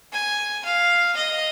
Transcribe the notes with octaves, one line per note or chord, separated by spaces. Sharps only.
G#5
F5
D#5